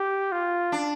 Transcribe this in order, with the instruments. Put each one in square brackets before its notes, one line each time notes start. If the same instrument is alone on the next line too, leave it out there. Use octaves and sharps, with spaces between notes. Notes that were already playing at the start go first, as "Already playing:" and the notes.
Already playing: [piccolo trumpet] G4
F4
[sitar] D4